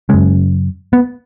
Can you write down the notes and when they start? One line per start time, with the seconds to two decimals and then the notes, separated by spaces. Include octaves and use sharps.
0.09 F#2 C#3 G#3
0.93 B3